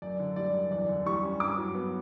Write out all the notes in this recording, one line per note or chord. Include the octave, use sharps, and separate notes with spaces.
F#2 D5
D3
G3 D5
F#2
E2 D5
D3
G3 C#6
C#4
G2 D6
F#3
B3